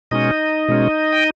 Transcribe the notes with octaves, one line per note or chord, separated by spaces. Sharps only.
B2 G#3 C#4 D#4 D#5
B2 G#3 C#4
G5